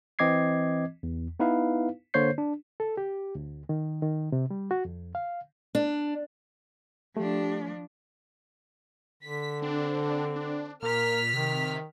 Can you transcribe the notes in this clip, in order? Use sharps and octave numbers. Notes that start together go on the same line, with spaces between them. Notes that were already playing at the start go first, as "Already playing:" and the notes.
E3 C4 D#5 D6 G#6 C7
E2
B3 D#4 E4 B4 F5
D3 A#3 C5 C#5 G6 C7
D4
A4
G4
D2
D#3
D#3
C3
G3
F#4
F2
F5
D4
F3 A3 D4 G4
D3 B6
C4 D4
D4
A#2 A#4 F6 B6
C3 D#3